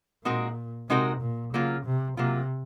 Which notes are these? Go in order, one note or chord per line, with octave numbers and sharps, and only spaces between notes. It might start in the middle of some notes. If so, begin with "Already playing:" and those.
A#2 G#3 C4 D#4 F#4 A#4
C3 G#3 C4 D#4 F#4 A#4
A#2
C#3 F#3 A#3 F4
C3
C3 F#3 A#3 F4